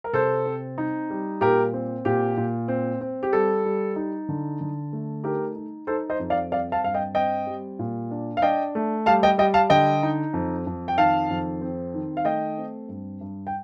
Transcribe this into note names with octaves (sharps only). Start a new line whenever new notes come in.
A#4
C3 A4 C5
C4
D#4
G3
A#2 G4 A#4
C4
A#2 G4
A#2
C4
C4
G4
G3 A4
G3
D#4
D3
D3
A3
D#4 G4 A#4
D#4
D#4 A4 C5
C5 D#5
F2
D5 F5
C4 D5 F5
F5 A5
G2 F5
D#5 G5
C4 D#5 G5
G3
A#2
D4
F5
D4 D#5 G5
A3
G3 F5 A5
D#5 G5
G3 D#5 G5
F5 A5
D3 D#5 G5
D#4
F2
F2
G5
D#3 F5 A5
F2
C4
D#3
F5
A3 D#5 G5
C4
G2
G2
G5